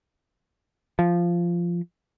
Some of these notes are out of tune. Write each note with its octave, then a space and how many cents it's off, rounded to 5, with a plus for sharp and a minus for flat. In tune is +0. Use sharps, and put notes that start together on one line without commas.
F3 -10